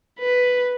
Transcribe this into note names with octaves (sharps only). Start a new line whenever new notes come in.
B4